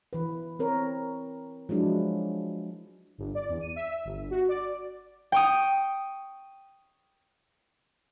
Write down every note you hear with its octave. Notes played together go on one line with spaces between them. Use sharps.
E3 B4
C4 A#4 C#5
F3 F#3 G#3 D4 E4
G1
D5
E2
D#7
E5
G1
F#4
D5
G5 C#6 D#6